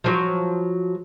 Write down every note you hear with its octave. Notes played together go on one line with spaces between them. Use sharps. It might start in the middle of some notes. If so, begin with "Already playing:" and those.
F3 F#3 C#5